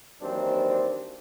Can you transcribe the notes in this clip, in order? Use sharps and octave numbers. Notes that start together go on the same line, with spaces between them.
D#2 E3 F#3 C4 D4 C5